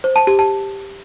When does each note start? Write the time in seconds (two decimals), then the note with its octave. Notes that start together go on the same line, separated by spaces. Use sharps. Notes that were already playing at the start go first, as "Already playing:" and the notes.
0.04 C5
0.16 A5
0.27 G4
0.39 A5